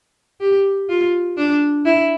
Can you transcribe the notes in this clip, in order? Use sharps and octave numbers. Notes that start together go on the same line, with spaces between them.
G4
F4
D4
E4